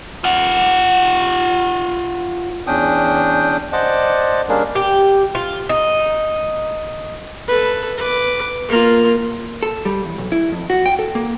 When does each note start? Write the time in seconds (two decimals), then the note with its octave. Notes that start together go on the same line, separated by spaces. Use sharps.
0.24 F4 F#5
2.67 E2 C#4 D4 G5 D#6
3.73 C5 D5 D#5 F#5 A5 D6
4.49 G3 A#3 C#4 D4 G#4 A#4
4.75 G4
5.35 F4
5.69 D#4
7.48 A4 B4
7.98 B4 D6
8.69 A#3 F4
9.63 A4
9.85 G3
10.03 E2
10.18 B1
10.32 E4
10.52 F2
10.70 F#4
10.86 G5
10.99 A4
11.15 A#3